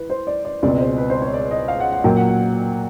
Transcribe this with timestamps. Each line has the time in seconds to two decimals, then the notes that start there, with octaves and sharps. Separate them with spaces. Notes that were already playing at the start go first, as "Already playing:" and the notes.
Already playing: E3 B4
0.10 C5
0.27 D5
0.45 D5
0.62 C#2 B2 G#3 C4 D5
0.80 C5
0.98 B4
1.10 C5
1.22 C#5
1.33 D5
1.51 D#5
1.68 F5
1.80 F#5
1.92 F#5
2.04 A#2 F#3 A#3 G5
2.16 F#5
2.28 F#5